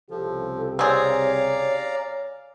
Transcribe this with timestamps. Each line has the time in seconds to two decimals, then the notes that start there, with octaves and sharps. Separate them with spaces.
0.10 C2 C#3 F3 G4 A4
0.79 C4 G#4 C#5 D5 F5 A#5